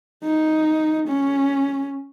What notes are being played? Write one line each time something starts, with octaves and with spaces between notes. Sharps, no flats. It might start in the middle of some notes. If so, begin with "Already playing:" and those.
D#4
C#4